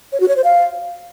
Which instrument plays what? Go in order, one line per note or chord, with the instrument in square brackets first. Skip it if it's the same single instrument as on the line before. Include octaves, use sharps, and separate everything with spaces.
[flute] C#5
F#4
C#5
C5
F5